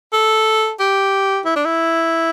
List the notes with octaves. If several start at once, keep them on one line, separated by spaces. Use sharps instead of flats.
A4
G4
E4
D4
E4